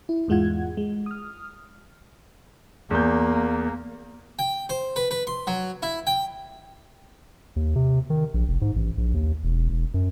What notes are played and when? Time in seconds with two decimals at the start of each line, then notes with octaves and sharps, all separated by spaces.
0.09 E4
0.28 E2 G#2 G#3 F4 F#5 G#6
0.77 G#3
1.06 D#6 F6
2.91 E2 A#3 G6
4.39 G5
4.69 C5
4.96 B4
5.11 B4
5.27 C6
5.47 F#3
5.83 E4
6.07 G5
7.56 D#2
7.76 C3
8.10 D#3
8.34 A#1
8.48 F1
8.61 G#2
8.76 A1
8.98 A#1
9.14 D#2
9.44 E1
9.69 E1
9.94 F#2